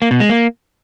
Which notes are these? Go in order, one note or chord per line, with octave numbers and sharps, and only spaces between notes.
A#3
B2
G#3
A#3